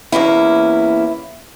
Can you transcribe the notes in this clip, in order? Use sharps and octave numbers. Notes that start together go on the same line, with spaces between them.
E2 A#3 C#4 E4